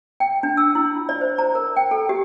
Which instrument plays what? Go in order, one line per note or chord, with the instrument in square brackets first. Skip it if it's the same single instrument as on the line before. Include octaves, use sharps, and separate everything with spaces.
[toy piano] G5
D4
E6
E4
F4
D5
C5
A#5
A#4
G5
A4
G4